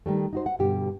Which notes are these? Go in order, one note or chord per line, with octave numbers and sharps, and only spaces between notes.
D#3 G3 A3
D#4 F#4 C5
F#5
G2 B2 D3 G4